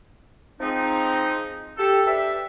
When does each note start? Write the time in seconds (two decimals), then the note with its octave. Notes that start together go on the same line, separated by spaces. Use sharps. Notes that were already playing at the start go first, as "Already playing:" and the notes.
0.60 F3 G#3 C4 D#4
1.77 G4 A4
2.06 D4 G4 B4 E5